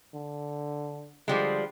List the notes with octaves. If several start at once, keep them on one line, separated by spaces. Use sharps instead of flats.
D3
D3 F3 G3 G#3